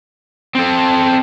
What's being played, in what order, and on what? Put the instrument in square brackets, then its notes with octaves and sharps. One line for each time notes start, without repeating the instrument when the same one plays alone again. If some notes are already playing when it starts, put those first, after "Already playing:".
[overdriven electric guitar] C4 A4